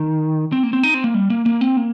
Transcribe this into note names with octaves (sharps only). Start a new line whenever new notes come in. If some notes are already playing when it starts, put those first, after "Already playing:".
Already playing: D#3
C4
A#3
C4
D#4
C4
A#3
G3
A#3
A#3
C4
A#3